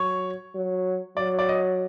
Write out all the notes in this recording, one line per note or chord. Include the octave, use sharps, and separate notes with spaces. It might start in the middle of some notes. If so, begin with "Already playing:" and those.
Already playing: F#3 C#5
F#3
F#3 D5
D5
D#5